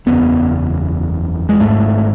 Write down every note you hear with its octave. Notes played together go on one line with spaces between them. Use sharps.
F#1 E2 C#3 B3
G#3
G#1 G#2 A3